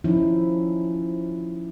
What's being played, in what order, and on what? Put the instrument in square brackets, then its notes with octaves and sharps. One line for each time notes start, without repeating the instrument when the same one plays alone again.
[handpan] F3 C#4 D#4 E4